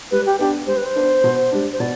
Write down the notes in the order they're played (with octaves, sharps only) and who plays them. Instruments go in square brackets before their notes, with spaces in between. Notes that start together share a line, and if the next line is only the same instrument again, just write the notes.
[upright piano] G3 [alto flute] B4
[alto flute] G4
[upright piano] B3 D4 [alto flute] G4
[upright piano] G3 [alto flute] C5
[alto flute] B4
C5
[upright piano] B3 D4
B2
G3 D4
[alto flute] C5
[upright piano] B2 [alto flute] D5